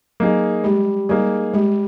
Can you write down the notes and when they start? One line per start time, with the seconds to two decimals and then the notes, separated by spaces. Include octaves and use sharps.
0.20 F#3 A#3 D#4 G#4
0.64 G3 G#3
1.09 G3 A#3 D#4 G#4
1.54 G3 G#3